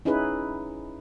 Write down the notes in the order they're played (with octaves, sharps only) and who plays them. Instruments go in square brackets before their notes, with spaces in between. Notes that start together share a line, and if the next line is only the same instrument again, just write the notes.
[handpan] C#4 D#4 E4 G#4 B4